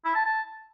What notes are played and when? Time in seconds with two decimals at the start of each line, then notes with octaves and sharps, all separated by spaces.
0.05 E4
0.15 A5
0.26 A5